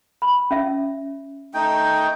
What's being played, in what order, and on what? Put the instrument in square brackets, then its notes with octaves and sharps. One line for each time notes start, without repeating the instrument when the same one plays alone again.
[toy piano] B5
C#4 E5
[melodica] A3 D#4 G5